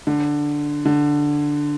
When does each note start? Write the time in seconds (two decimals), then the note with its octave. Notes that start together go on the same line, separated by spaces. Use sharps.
0.07 D3
0.85 D3